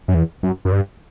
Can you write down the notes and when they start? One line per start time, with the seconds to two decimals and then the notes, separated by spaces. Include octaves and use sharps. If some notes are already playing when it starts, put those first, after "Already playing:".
0.08 F#2
0.14 E2
0.43 F#2
0.65 F#2
0.72 G2